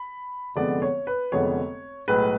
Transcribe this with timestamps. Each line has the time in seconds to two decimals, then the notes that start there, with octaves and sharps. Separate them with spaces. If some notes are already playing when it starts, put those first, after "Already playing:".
Already playing: B5
0.56 F1 F2 D3 G#3 B3 D5
0.82 C#5
1.07 B4
1.32 F1 F2 D3 G#3 B3 C#5
2.07 B1 A2 G#3 B4